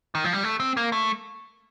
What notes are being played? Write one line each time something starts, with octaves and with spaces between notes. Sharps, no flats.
D#3
F3
G3
A3
C4
A#3
A3